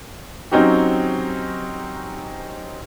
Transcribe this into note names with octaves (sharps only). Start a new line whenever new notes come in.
F#3 C4 C#4 D#4 F#4 G4